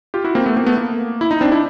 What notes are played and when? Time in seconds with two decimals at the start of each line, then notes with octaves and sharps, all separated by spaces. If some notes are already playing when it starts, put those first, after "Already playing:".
0.14 F4 G4
0.24 E4 F#4
0.35 A#3 C4
0.46 A3 B3
0.56 A#3 C4
0.66 A3 B3
0.78 A#3
1.21 E4
1.31 D#4
1.41 C4 D4
1.52 D4 E4